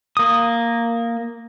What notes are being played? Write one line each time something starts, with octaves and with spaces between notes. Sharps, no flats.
A#3 D#6